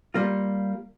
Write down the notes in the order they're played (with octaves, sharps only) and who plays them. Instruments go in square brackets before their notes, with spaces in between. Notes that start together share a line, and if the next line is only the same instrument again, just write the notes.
[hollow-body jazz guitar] G3 A#3 F4